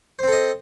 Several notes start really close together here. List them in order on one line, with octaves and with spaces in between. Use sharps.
C5 C4 A4 D#5